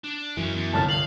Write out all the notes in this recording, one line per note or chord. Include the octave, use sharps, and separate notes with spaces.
D4
F#2 E3 G#3 C#4
E2
G1 C2 A5 F6
F5 F#7